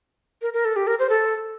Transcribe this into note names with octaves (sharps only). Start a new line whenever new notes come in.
A#4
A#4
A4
G4
A#4
C5
A4